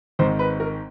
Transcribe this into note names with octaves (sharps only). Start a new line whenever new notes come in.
G#1 G#2 D#3 C5
B4
A#4